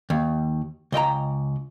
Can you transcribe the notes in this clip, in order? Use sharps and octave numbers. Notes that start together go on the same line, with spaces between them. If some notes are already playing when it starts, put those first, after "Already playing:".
D#2
C#2 D#5 G5 A#5